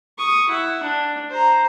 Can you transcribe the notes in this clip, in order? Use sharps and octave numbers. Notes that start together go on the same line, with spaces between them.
C#6 D#6
E4 F#5
D4
C5 A#5